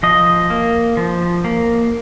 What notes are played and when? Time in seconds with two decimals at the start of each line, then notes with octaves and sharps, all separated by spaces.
0.03 F3 D#5
0.50 A#3
0.97 F3
1.44 A#3